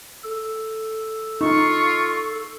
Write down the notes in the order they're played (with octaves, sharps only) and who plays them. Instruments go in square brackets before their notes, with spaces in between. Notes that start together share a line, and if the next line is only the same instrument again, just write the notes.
[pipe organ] A4
[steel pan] D#4 [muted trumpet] F4 [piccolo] C#6